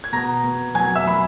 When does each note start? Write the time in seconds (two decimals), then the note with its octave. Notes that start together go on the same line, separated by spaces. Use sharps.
0.04 G#6
0.12 B2 A#5 A#6
0.44 B2
0.75 F#3 G#5 G#6
0.95 E5 E6
1.06 F#3 B5